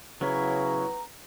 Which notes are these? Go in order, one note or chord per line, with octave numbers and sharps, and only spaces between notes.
C#3 F#3 B3 C#4 E4 A#5